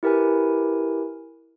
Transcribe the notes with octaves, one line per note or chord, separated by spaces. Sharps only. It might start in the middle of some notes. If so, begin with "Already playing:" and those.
E4 G4 A#4 B4 G#5